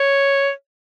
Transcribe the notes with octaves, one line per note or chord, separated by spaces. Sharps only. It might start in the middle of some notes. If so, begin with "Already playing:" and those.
Already playing: C#5